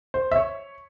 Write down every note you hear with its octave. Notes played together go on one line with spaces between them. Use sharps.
C5
E5
C#5